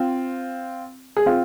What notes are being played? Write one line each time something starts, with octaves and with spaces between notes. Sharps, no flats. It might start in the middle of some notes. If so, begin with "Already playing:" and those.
Already playing: C4 F4
G#4
C4 F4